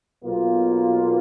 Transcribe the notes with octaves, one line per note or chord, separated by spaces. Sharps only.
B1 B2 A#3 F4